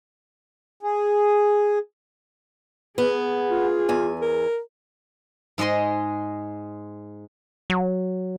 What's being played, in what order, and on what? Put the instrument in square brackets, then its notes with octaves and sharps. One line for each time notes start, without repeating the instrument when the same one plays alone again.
[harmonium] G#4
[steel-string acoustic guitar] B3 [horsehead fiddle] G#4
[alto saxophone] F4
[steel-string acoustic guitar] E2 G#5
[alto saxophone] A#4
[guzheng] G#2 G#3 G#4 D#5 C6
[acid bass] F#3